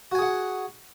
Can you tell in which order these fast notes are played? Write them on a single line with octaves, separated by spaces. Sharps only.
F#4 G#5 G#4 F#5